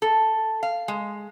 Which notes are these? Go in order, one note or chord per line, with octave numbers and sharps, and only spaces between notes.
A4
F5
G#3